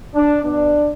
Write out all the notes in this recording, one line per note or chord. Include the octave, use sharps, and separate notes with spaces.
D4
B2 D4